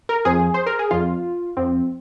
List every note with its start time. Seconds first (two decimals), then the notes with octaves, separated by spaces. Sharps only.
0.09 A#4
0.25 F2 F3 G#4
0.54 C5
0.66 A#4
0.79 G#4
0.91 F2 F3 F4
1.57 F2 F3 C4